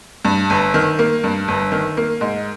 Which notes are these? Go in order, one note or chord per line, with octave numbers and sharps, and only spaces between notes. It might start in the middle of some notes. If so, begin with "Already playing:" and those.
G2
G1
D#3
A#3
G2
G1
D#3
A#3
G#2